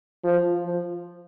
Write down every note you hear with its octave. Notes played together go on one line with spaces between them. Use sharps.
F3
F3